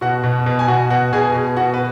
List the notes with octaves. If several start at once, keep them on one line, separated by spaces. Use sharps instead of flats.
B2 F#4 F#5
B2
B2
G#5
B2 F#4 F#5
B2 F#4 F#5
B2 G#4 G#5
B2
B2 F#4 F#5
B4